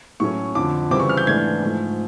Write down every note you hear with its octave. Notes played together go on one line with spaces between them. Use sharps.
A2 F#3 A3 C#4 C#6
F2 D3 F3 D6
C#3 E3 G3 C4 E4 D6
C#6
F6
G6
G#2 E3 A3 D4 G#6
G#2 F3 A3